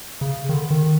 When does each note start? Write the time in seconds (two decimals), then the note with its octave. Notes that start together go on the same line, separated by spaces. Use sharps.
0.21 C#3
0.49 D#3
0.53 D3
0.71 D#3